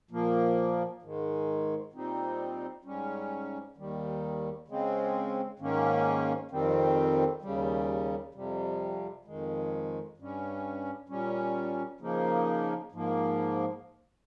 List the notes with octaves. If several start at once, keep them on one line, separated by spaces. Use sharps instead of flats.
A#2 F3 A#3
G#2 D#3 G#3
A#2 G3 C4 D#4
G#2 G3 C#4
D#2 D#3 G3
C#3 G#3 C4
G#2 D#3 A#3 C#4
F2 D#3 G3 C4
D#2 C#3 G3
F2 C3 G3
F2 D#3 G#3
G2 G3 C#4
A#2 G3 C#4
C#3 F3 A#3 D#4
G#2 F3 A#3